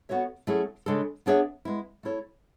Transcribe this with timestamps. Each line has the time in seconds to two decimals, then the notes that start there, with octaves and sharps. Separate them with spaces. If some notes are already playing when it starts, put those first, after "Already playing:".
0.09 B3 F#4 A4 C#5 E5
0.47 F#3 A3 C#4 E4 G#4
0.86 C#3 G#3 D4 A4
1.26 B3 D4 G#4 C#5 E5
1.65 G#3 B3 E4
2.03 A3 E4 A4 C#5